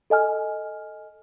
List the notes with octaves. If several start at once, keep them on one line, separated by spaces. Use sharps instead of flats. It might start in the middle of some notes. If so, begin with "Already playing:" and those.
A4 D#5 G#5 F6